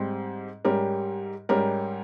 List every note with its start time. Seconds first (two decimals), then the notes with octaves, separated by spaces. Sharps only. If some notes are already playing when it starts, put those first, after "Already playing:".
Already playing: G#2 G3 C4
0.65 G#2 G3 C#4 G4 A#4
1.49 G#2 G3 C#4 G4 A#4